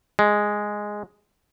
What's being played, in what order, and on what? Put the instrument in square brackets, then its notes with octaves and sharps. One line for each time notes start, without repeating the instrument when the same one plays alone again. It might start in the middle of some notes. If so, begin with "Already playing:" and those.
[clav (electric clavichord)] G#3